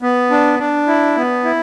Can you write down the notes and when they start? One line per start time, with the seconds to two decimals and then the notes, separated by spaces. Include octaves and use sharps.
0.02 B3
0.31 D4
0.59 D4
0.87 E4
1.16 B3
1.44 E4